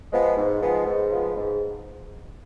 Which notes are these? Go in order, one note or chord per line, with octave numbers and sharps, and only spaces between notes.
F3 G#3 B3
G#2
F3 G#3 B3
G#2
F3 G#3 B3
G#2